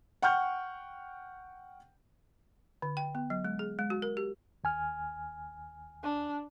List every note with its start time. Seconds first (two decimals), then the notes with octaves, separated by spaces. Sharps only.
0.22 F#5 G5 C#6 F6 G6
2.82 D3
2.97 G5
3.15 B3
3.30 F#3
3.45 G#3
3.59 G#4
3.79 G#3
3.90 F#4
4.02 A#4
4.17 G4
4.64 D#2 G#5 F6
6.03 D4